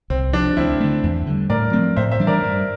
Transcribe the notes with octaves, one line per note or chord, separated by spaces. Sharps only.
C2 C4
C3 F3 D4
D2 C4 E4
D3 A3
E2
D3 G3
A2 A#4 D5
F3 A3 C4
A2 C5 E5
C5 E5
E3 G3 D4
A#4 D5
G2